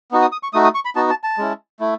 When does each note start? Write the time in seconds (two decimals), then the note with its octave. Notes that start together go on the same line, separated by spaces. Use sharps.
0.11 B3 D#4 F#4
0.22 D#6
0.32 D#6
0.43 C#6
0.53 A3 D#4 F#4 D#6
0.64 D#6
0.75 C#6
0.85 B5
0.96 B3 D#4 F#4 A5
1.10 A5
1.24 A5
1.38 G#3 C#4 E4
1.80 A3 E4